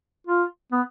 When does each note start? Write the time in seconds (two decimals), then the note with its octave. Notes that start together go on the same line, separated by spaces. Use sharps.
0.27 F4
0.72 B3